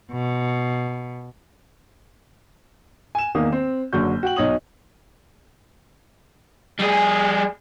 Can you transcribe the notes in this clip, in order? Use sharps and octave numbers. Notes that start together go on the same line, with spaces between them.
B2
G#5 E7
E2 D#3 A#3 D#6
C4
F#1 D3 F#3 F#4 C#6 G6
F#4 G5 F#7
B1 D#4 C#5 D#5 D#6 F#7
G3 G#4